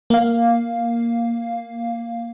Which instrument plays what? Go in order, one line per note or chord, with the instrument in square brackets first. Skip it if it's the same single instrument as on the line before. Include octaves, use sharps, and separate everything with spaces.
[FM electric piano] A#3 F5